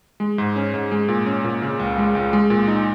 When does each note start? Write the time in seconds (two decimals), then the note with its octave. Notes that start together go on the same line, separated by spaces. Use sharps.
0.20 G#3
0.38 G#2
0.56 C#4
0.74 G#2
0.91 G#3
1.08 A#2
1.26 C#4
1.44 A#2
1.62 C#3
1.79 C#2
1.98 G#3
2.15 C#2
2.33 G#3
2.50 A#2
2.68 D#4